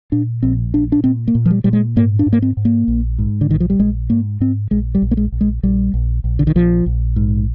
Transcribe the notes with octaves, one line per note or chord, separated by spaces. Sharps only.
A#2 D4
A#1 C4
A#2 D4
D4
A#2 C4
A#3
A#2
F3
G3
A#2 G3
G#3
G#2 A#3
D4
G#2
A#3
C4
G#2
A#3
A#1
G#2
D3
A#1 D#3
F3
G3
A#1 G#3
G#2 A#3
G#2 C4
A#1 G#3
G3
A#1
A#3
G#3
A#1
G#3
A#1 G3
A#1
A#1
D3
D#3
A#1 F3
A#1
G#2